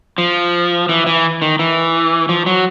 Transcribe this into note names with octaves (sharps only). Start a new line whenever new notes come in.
F3
E3
E3
D#3
E3
F3
F#3